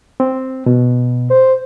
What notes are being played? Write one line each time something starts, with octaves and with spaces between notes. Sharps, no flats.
C4
B2
C5